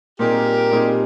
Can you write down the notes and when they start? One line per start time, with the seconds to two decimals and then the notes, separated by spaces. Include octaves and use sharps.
0.19 A#2 G3 C4 D#4 G4 G#4 A#4
0.71 A#2 G3 C4 D#4 G#4